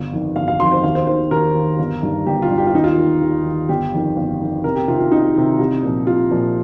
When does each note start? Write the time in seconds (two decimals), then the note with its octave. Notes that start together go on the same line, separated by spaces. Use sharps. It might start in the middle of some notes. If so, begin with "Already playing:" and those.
Already playing: G1
0.12 F2 D#3
0.36 G1 F5
0.48 F5
0.60 F2 D#3 C6
0.72 C5
0.84 D#2 F5
0.95 C5
1.07 D#3 C5
1.31 D#2 A#4
1.55 D#3
1.79 G1
2.02 G2 D#3
2.26 G1 G4
2.42 F4
2.50 G2 D#3
2.58 G4
2.67 F4
2.74 D#2 D#4
2.84 F4
2.98 D#3
3.21 D#2
3.45 D#3
3.69 G1 G4
3.93 F2 D#3
4.16 G1
4.40 F2 D#3
4.64 C2 A#4
4.76 G4
4.88 C3 D#3 F4
5.00 F4
5.12 C2 D#4
5.35 C3 D#3
5.59 C2
5.83 A#2 F3
6.07 C2 F4
6.31 A#2 F3